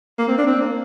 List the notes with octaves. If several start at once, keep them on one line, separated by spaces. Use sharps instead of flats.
A#3
C4
D4
C4
A#3